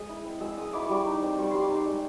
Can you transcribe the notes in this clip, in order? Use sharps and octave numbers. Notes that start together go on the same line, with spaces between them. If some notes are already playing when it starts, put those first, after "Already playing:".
Already playing: G#3 D#6
E4
C4
G#3 E6
G#3 D#6
E4 D6
C#6
G3 D6
D#4
C4
G3 C#6
G3 C6
D6
D#4 C#6
G#3